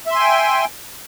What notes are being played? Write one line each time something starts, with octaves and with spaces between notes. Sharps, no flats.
E5 G5 G#5 C6